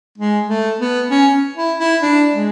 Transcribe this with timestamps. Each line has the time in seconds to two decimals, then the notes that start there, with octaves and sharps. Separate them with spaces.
0.18 G#3
0.48 A3
0.80 B3
1.10 C#4
1.57 E4
1.79 E4
2.02 D4
2.33 G#3